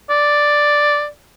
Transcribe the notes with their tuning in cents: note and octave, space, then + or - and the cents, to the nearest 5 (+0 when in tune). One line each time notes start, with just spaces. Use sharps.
D5 +0